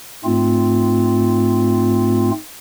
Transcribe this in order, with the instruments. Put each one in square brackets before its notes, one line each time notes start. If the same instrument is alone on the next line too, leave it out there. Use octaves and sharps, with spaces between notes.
[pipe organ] G#2 A3 C4 F4